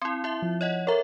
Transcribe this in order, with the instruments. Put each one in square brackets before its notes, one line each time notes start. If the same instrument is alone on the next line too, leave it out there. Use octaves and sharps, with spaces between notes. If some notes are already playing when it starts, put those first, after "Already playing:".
[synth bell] C4 E4 [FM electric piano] C6
[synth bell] E4 E5
[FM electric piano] F3
[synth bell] C#5 D#5 F#5
[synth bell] A4 E5 [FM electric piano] A#4 C#5